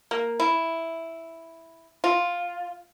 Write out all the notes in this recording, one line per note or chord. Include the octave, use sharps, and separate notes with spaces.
A#3
E4
F4